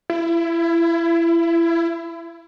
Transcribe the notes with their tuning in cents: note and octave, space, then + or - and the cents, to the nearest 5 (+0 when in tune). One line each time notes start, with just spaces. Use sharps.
E4 +25